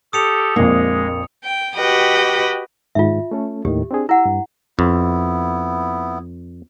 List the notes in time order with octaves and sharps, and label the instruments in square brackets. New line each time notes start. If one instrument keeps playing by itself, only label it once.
[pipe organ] G4 A4 [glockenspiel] D#6 C#7 F7
[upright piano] A#1 F2 [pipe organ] G#3 [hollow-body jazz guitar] A#3
[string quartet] G5
F#4 G4 B4 D#5 G5
[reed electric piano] G#2 D#3 [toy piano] F4 E5
[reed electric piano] A3 C#4 A4
[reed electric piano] D#2 A2 D#3 [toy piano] G4
[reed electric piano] C4 D4 G#4
[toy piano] E4 F#5 [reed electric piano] E6
[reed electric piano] G2
[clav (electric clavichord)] F2 [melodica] B3 E4